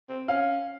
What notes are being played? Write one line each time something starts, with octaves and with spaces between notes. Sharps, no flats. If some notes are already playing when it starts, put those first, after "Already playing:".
C4
C#4 F5